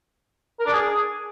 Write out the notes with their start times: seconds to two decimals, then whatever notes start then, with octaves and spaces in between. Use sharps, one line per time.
0.60 A#4
0.66 D4
0.73 G#4